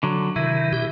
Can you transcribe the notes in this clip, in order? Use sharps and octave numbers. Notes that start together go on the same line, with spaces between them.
D3 F#3
C3 D#3 E4
B2 G4